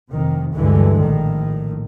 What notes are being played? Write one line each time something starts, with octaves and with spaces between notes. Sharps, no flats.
F1 C3 D#3
D2 G2 D3 E3 G#3
A#1 A2 D#3